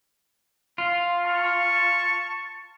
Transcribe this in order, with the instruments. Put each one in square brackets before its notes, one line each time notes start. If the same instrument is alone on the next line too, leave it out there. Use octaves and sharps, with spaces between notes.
[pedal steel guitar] F4
[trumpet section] A5 C#6